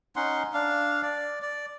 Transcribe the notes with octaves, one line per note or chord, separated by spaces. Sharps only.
C#4 D#4 F#5 C6
D4 F5
D5
D5